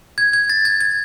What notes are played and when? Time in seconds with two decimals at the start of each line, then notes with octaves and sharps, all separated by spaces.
0.18 G#6
0.33 G#6
0.50 A6
0.65 G#6
0.80 G#6